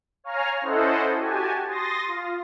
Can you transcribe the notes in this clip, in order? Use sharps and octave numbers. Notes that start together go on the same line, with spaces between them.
C#5 F5 G#5 A#5 F6
C#4 E4 A4 C5 D#5 F#5
F#4 G4 G#5 A5
C6 D#6 A6 A#6
F4